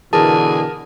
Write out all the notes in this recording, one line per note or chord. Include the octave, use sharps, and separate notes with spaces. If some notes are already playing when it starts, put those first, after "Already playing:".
B2 D3 E3 G#4 A#4 A5